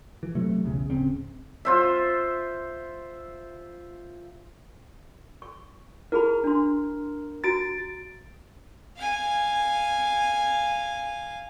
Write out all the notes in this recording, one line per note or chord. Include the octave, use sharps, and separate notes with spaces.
E3
C3 F#3 A3
B1 E2 C#3
D1 C#3 C4 C#4
F4 C5 E5
C#6
E4 G#4 A#4 B5
D4 C6
F#4 A#5 A6 D7
F5 G#5